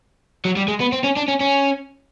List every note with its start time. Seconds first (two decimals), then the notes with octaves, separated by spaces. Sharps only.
0.45 F#3
0.56 G3
0.68 G#3
0.80 B3
0.92 C4
1.04 C#4
1.17 D4
1.28 C#4
1.41 C#4